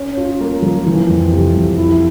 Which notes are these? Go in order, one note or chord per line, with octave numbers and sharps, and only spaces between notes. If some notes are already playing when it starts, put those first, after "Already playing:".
Already playing: C#4
F4
A#3
F3
E3
F2
C3
F2
E4